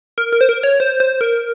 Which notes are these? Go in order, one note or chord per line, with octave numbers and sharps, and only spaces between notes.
A#4
A#4
C5
A#4
C#5
C5
C5
A#4